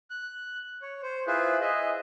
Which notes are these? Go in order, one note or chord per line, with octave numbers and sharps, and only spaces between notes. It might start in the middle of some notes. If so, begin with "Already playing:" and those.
F#6
C#5
C5
E4 F4 G#4 B4 C5
G#4 D#5 E5